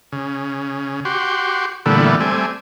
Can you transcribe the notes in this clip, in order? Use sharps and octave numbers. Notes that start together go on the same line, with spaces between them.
C#3
F#4 G4 C6
A#2 D3 E3 G3 A3 B3
G3 A3 C4 G#5